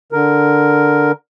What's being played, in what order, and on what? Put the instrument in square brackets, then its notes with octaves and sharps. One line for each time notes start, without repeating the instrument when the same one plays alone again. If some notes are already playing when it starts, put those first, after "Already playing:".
[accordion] D3 A#4